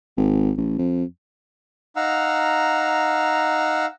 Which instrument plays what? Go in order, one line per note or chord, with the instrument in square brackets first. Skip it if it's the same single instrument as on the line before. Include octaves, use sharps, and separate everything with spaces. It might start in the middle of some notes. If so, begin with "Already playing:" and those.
[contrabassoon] G#1
A1
F2
[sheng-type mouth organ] D#4 F5 F#5 A#5 E6